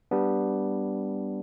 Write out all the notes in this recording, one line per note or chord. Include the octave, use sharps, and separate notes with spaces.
G3 B3 D4